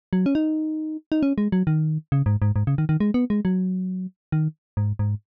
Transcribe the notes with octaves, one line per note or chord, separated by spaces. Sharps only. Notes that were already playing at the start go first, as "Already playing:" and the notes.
F#3
C#4
D#4
D#4
C#4
G#3
F#3
D#3
C#3
G#2
G#2
G#2
C#3
D#3
D#3
G#3
B3
G#3
F#3
D#3
G#2
G#2